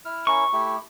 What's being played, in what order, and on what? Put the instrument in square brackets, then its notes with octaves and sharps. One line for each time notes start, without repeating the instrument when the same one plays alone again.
[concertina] E4 F6
[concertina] C#4 E4 A#4 [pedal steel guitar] C#6
[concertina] A3 E4 G4